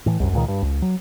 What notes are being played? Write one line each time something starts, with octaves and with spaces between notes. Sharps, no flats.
A2 E3
C2 F#2
C#2 A#2 D#3
G2
C#2
F#3